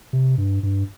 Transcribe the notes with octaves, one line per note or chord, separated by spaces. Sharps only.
C3
G2
G2